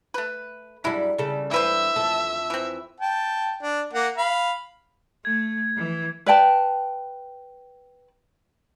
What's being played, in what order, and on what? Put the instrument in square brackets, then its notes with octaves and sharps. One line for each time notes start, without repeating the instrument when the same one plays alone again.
[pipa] A3 B4
[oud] F#2 G3 [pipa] G#3 D4 E4
[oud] C#3 G3 A4
[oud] G2 [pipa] E3 B4 C5 [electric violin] E5
[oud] F2 A4
[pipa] E3 C4
[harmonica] G5 A5
D4
A#3 F#5
F5 B5
[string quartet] A3 [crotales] G#6
[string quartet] E3
[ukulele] B4 D5 G5 A5